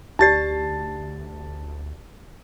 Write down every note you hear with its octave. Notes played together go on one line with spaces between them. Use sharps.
D2 D#4 G4 D5 A5 A6 C7